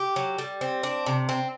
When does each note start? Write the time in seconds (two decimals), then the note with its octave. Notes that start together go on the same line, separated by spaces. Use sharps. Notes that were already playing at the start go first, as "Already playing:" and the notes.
Already playing: G4
0.16 F#3
0.38 G3
0.61 C4
0.83 D4
1.06 C3
1.29 C4